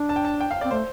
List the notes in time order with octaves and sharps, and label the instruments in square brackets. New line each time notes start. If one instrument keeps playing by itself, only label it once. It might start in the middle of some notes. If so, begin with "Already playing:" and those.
Already playing: [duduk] D4
[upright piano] A5
G5
A5
G5
F5
[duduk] C4 [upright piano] D5
[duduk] A3 [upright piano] C5